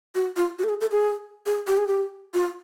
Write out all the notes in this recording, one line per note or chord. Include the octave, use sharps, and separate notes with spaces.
F#4
F4
F#4
A4
G#4
A4
G#4
G#4
G4
G#4
G4
F4